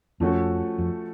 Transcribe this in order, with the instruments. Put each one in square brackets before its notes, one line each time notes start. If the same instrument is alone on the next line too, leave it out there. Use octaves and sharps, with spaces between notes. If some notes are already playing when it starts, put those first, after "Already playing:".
[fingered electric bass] F2 [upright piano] F3 A3 C#4 F#4 A4
[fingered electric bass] F2